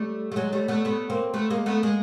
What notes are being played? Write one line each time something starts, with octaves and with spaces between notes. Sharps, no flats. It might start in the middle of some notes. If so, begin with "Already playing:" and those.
Already playing: G3 A3
A3
F#3 G#3
G3 A3
A3 B3
A3 B3
A#3 C4
A3 B3
G#3 A#3
A3 B3
G#3 A#3